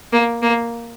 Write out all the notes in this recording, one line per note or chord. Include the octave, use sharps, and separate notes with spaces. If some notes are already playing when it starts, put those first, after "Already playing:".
A#3
A#3